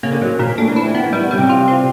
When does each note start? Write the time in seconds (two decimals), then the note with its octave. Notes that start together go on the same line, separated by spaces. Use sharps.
0.03 C#3 A#3
0.12 D3
0.21 D#3 F#3
0.39 A#2 F3
0.49 A#3
0.58 A3 D4
0.67 E3
0.76 F3 E4
0.86 E3
0.95 D#3 B3
1.04 E3
1.13 D#3 G3
1.31 C#3 G3
1.38 C3
1.49 F4
1.68 C4